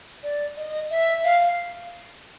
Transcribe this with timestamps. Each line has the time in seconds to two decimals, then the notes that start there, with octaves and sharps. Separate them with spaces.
0.23 D5
0.57 D#5
0.90 E5
1.25 F5